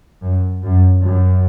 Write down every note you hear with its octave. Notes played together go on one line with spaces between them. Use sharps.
F#2
F#2
F#2